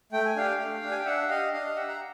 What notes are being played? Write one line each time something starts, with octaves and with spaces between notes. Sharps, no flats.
A3 G5
G#5
D4 G4 F5 G5
A3
D4 G4
G#5
G5
D4 E5 F#5
G4 D#5 F5
D4 D#5 F5
G4 E5 F#5
A#5